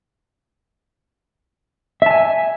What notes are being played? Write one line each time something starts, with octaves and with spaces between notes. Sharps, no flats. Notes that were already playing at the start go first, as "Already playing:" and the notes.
E5 G#5 A5